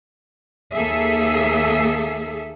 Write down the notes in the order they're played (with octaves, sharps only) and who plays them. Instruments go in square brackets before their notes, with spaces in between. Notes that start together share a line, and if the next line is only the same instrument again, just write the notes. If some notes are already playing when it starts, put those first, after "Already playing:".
[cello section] D#2 A#3 G#4 A4 E5